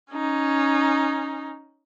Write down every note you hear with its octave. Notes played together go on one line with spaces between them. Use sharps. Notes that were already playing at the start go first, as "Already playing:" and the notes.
C#4 D#4